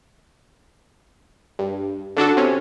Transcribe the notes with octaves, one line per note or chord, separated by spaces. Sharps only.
G2
D3 D4 F#4 A4
C3 C#4